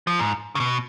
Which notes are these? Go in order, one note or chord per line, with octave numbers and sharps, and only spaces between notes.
F3
G#2
C#3
B2